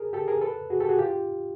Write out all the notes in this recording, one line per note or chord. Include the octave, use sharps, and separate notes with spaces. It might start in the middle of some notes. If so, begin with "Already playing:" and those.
Already playing: G#4 A#4
G4 A4
G#4 A#4
A4 B4
F#4 G#4
G4 A4
F#4 G#4
F4 G4